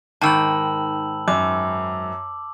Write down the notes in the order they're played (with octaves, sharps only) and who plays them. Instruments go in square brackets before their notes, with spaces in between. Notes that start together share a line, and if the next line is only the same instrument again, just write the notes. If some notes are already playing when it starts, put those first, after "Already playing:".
[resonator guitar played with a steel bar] G#2 D#3 [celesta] G5 B5 [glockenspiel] A5 E6 F#7
[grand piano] F#2 [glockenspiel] D6